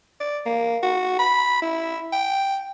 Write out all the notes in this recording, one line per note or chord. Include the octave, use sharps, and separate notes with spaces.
D5
A#3
F#4
B5
E4
G5